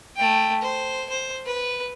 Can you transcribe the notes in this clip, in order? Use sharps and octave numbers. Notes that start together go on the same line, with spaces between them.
A3 G5
C5
C5
B4